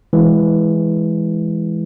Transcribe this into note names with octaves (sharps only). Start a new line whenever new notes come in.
E3 G#3